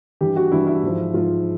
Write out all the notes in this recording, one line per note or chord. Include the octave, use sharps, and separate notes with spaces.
G2 E3 G4
F#4
G2 E3 E4
E4
G#2 F3
G#2 F3 F4